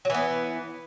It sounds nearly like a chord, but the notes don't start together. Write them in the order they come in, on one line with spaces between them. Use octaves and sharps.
F#3 E3 B3